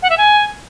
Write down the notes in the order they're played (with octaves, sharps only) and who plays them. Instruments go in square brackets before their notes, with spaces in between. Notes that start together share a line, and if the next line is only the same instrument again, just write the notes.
[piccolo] F#5
E5
G#5